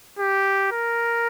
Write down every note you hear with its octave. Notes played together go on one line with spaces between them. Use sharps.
G4
A#4